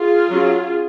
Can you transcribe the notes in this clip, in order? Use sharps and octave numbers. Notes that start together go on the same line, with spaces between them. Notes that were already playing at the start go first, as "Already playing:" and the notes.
Already playing: F4 G#4
F#3 C#4